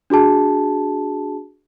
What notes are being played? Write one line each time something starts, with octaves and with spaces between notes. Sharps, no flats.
D4 F#4 G#4 A5